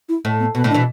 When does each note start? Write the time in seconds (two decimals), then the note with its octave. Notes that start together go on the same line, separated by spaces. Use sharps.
0.09 E4
0.25 A2
0.40 B3
0.54 B2 B3
0.64 A2 D3
0.70 D4
0.74 B2 E3